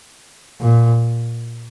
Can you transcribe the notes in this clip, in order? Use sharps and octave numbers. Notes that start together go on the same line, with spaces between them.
A#2